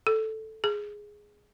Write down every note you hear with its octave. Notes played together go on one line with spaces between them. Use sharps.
A4
G#4